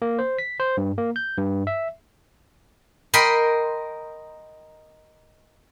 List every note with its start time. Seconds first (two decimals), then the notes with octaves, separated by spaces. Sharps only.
0.02 A#3
0.19 C5
0.39 B6
0.60 C5
0.77 G2
0.98 A#3
1.16 G6
1.38 G2
1.67 E5
3.14 A#4 D#5 G5 B5 C6